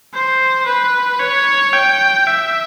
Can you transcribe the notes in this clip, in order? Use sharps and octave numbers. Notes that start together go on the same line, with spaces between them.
C5
B4
C#5
G5
E5